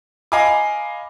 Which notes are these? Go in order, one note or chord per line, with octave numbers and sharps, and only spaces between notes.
D#5 F5 G#5 A#5 B5 D6